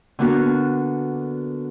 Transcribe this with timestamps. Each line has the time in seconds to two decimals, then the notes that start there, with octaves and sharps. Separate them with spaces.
0.19 D3 A#3 B3 D4 F#4 A#4